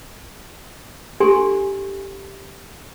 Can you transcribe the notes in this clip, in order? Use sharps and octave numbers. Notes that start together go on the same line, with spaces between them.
D4 G4 A4 G#5 C6 C#6